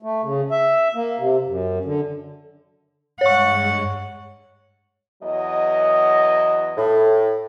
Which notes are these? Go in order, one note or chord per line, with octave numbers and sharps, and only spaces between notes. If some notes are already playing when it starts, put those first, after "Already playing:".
A3
C#3
E5
A#3
C3
F#2
D3
G2 G#3 C#5 F#5 C#6
E2 F#3 D#5
A2